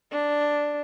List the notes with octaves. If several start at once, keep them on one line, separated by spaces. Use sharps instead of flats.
D4